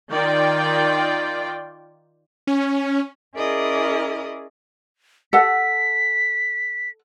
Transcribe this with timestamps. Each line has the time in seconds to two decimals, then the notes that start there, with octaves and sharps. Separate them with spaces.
0.11 D#3 F4 D5 G5
2.47 C#4
3.35 C#4 E4 G#4 A#4 D5 D#5
5.33 A4 F#5 B6